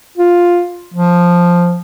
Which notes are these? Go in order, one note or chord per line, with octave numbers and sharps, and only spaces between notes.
F4
F3